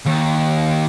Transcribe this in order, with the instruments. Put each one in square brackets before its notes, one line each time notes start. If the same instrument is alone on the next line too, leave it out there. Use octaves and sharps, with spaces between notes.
[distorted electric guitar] D#2